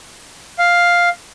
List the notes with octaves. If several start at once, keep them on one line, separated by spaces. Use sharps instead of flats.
F5